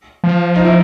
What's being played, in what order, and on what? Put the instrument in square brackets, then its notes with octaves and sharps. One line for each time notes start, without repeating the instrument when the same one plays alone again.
[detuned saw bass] F3
[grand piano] D#4
E4